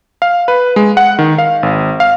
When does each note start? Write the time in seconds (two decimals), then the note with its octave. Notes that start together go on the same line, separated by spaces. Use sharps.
0.22 F5
0.48 B4
0.76 G#3
0.97 F#5
1.19 D#3
1.38 F5
1.63 G#1
2.00 F5